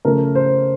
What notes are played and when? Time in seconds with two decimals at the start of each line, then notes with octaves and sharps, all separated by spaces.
0.05 C#3 F3 A3 A#4
0.35 C5